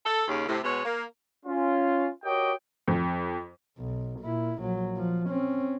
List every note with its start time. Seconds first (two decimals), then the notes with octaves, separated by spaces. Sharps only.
0.05 A4
0.28 D#2 C#3
0.48 A2 C3
0.63 B2 G#3 B3 C#5
0.84 A#3
1.46 C#4 F4
2.24 F#4 G4 A#4 C#5 D#5 G5
2.87 F2
3.78 B1
4.21 A#2 E4
4.61 A#1 F#3
4.97 F3
5.28 C4 C#4